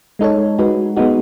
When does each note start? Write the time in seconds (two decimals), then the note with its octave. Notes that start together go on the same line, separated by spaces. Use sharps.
0.19 G#3 D#4 A4 C#5
0.59 G#3 D#4 F#4 B4
0.97 G#3 B3 D#4 F#4